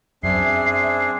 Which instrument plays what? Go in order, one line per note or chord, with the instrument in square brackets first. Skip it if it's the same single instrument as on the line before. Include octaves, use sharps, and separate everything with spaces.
[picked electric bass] F#2 [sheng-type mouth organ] C4 D4 G#4 [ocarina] E5 [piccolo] C7